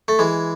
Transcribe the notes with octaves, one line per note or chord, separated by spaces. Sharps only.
A3
E3 G#3